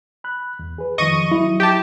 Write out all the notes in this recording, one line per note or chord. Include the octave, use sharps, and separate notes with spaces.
B5 F#6
E2
G#4 B4
F2 D#3 F3 D#5 C#6 D#7
F#3 E4
G4 A5